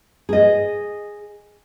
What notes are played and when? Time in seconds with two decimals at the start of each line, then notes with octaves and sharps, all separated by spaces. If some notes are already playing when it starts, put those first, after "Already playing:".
0.29 G#4 D#5